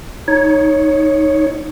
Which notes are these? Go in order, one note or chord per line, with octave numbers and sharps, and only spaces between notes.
D#4 C#5